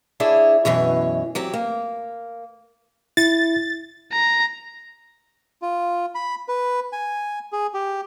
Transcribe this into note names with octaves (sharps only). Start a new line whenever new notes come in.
D4 E4 G#4 C#5
F#2 B2 E3 C#5
F#3 C4 G4
A#3
E4 A6
A#5
F4
B5
B4
G#5
G#4
G4